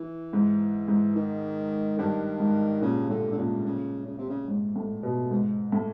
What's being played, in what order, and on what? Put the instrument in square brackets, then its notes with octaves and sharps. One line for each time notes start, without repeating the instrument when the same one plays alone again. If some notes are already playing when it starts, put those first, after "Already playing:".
Already playing: [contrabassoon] E3
[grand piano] G#2
G#2
[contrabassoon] D#3
[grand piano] G2 [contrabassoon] D#3
[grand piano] G#2
[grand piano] A#2 [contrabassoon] C#3
[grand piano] A2 [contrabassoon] D3
[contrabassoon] D3
[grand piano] A#2 [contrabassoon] C#3
[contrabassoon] C#3
C#3
C3
C#3
[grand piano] G#2
A2
B2
G#2
A2